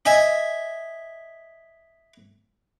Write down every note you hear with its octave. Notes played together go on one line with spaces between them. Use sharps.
D#5 E5 G#5